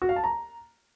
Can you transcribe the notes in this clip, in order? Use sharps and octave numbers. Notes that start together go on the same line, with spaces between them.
F#4
F5
A5
A#5